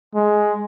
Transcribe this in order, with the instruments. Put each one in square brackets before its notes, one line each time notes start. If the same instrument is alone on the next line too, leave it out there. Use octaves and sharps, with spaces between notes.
[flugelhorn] G#3